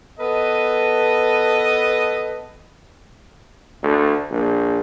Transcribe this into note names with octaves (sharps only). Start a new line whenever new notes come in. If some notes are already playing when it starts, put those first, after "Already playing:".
B3 A4 B4 D#5
D2
A#1